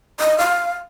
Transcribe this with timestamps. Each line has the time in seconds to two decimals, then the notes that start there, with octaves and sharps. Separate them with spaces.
0.20 D#5
0.38 F5